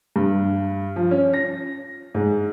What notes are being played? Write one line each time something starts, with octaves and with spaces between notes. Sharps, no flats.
G2
F3
C#4
A#6
G#2